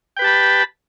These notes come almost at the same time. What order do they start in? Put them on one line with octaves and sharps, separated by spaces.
G5 B4 G4 A5 B5